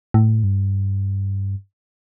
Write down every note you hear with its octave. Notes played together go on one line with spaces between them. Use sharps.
A2
G2